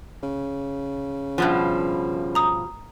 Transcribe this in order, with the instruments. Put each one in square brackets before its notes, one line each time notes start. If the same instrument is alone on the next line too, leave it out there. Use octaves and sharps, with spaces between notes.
[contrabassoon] C#3
[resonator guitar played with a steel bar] G2 B2 F3
[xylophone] A#5 D#6